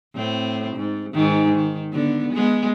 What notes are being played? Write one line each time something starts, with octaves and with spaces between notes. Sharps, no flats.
A2 C4
G#2
G#2 D#3
D#3
D3 B3
G#3 B3